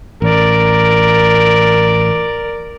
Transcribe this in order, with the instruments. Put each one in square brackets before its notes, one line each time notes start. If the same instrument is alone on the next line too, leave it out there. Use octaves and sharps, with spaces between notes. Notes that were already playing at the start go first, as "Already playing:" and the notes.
[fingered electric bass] A1 [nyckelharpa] A#4 D5